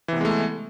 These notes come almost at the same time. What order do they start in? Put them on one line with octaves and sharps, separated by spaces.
E3 C3 B3 G#3 A3